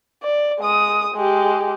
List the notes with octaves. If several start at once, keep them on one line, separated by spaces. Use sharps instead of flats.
D5
G#3 D#6
G#3 G4